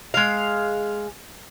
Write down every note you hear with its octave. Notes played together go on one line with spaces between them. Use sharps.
G#3 F5